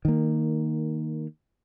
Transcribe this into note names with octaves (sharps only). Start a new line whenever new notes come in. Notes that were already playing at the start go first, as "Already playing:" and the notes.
D#3 A#3